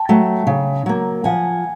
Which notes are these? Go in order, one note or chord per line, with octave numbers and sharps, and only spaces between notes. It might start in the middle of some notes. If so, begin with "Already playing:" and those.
Already playing: G5 A5
F#3 A3
C#3
F#3 A#3
F3 F#5 G#5